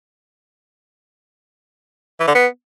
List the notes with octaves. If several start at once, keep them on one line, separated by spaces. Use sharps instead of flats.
E3
D3
B3